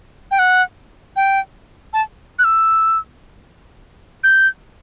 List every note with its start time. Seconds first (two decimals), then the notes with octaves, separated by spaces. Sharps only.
0.31 G5
0.39 F#5
1.16 G5
1.93 A5
2.39 F#6
2.44 E6
4.24 G6